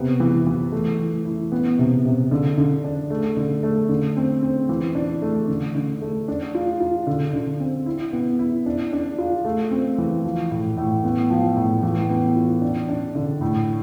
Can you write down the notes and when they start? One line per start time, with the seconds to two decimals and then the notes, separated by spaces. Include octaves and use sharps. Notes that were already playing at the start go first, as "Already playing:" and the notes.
Already playing: C3 B3
0.20 E3
0.46 E3
0.72 A3
0.99 E3
1.25 E4
1.52 B3
1.79 C3
2.05 C3
2.31 D3
2.57 D3
2.84 D4
3.10 A3
3.37 D3
3.63 A3
3.89 D3
4.16 C4
4.42 C4
4.69 E3
4.95 D4
5.22 A3
5.48 D3
5.74 D3
6.02 A3
6.28 D4
6.55 F4
6.80 F4
7.07 D3
7.33 D3
7.60 C4
7.86 E4
8.13 B3
8.39 E4
8.66 D4
8.93 D4
9.18 F4
9.45 A3
9.71 C4
9.98 E3
10.24 F3
10.51 A2
10.77 A2
11.04 B3
11.30 F3
11.56 A2
11.83 E3
12.10 B3
12.36 F4
12.62 D4
12.89 D4
13.15 D3
13.41 A2